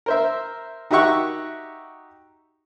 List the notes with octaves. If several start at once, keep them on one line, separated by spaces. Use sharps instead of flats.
A#4 C5 E5
D#4 F#4 G4 E5 F#5 C#6